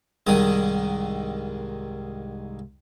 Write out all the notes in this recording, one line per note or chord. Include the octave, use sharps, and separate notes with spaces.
C2 G#2 D#3 D#6